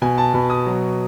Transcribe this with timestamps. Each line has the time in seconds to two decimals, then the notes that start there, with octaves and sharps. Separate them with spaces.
0.02 B2 G#5
0.18 A5
0.34 B2 B5
0.50 D#6
0.66 F#3